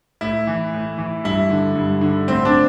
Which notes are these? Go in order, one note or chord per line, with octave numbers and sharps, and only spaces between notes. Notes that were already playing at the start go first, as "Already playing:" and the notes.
A2 E4
E3
A2
E3
G2 E4
D3
G2
D3
A2 C4
D4